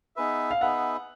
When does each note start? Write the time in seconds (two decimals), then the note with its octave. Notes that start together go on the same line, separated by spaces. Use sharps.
0.16 B3 D#4 G#4 B4 E5
0.51 F5
0.61 B3 D#4 G#4 B4 E5 F#5